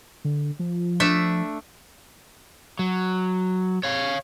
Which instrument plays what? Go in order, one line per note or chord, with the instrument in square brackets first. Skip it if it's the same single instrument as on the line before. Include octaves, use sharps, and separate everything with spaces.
[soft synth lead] D3
F3
[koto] A3 D4 E5
[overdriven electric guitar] F#3
C#5 F5